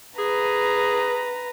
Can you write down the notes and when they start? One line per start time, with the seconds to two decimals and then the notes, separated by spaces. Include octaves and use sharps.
0.19 G#4 B4 A#5